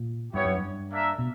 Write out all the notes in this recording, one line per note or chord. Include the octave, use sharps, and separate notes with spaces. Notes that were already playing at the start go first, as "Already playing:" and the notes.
Already playing: A#2
G2 B3 E4 G4 C#5
F#2
G2
A#3 D4 A#4 E5
B2